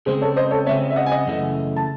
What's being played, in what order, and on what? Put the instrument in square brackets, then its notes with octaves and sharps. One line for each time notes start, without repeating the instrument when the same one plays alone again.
[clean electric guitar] C#3 G#3 C4 [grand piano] G#4 C5
[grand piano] A4 C#5
C5 D#5
A4 C#5
[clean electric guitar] C#3 G#3 C4 [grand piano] C#5 E5
[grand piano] E5
D#5 F#5
G#5
D#5 F#5
[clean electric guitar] F#2 C#3 E3 A3
[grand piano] A5